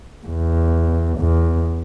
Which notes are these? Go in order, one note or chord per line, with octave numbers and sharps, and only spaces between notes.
E2
E2